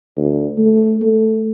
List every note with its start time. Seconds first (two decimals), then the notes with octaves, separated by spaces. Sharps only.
0.17 D2
0.58 A3
1.02 A3